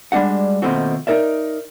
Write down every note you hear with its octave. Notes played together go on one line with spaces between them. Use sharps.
G3 G#3 D4 F#4 F#5
D#2 B2 F3 A3 C4 F#4
D#4 A#4 D5 E5